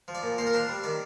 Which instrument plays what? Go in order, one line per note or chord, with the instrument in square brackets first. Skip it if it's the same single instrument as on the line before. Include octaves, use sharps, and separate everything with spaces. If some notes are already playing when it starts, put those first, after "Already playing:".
[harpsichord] F3
D5
A#2
A#3 C5
A#4
D4 C5
G3
D#3 D5